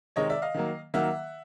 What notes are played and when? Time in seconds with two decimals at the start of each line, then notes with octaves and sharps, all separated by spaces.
0.16 C3 D#3 G#3 C#5 D#5
0.29 D5 E5
0.42 D#5 F5
0.54 D#3 F#3 A#3
0.94 D#3 F#3 A#3 E5 F#5